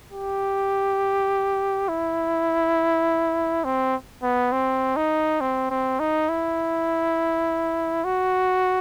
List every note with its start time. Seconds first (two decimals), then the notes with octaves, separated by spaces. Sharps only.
0.13 G4
1.89 E4
3.65 C4
4.23 B3
4.52 C4
4.96 D#4
5.41 C4
5.70 C4
6.00 D#4
6.29 E4
8.04 F#4